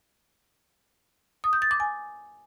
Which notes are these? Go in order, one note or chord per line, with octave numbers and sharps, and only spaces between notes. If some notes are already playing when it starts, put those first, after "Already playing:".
D#6
G6
A6
D6
G#5